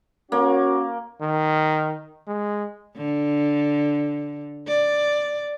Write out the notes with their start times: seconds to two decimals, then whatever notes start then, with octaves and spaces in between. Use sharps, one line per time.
0.32 A#3 C#4 F#4
1.21 D#3
2.28 G#3
2.97 D3
4.67 D5